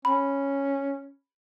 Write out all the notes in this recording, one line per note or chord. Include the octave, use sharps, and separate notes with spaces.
C#4 B5